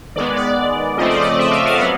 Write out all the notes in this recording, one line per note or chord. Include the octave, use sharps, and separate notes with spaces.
D#3 G#3 B3 D5
D5
C#3 F3 A3 C4 D#5
D5
D#5
E5
F5
F#5
F#3 B3 F5